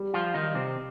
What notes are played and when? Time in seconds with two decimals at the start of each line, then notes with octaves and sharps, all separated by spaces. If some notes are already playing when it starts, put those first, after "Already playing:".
Already playing: G3
0.13 F3 F4
0.34 D#3 G3 D#4
0.55 C3 C4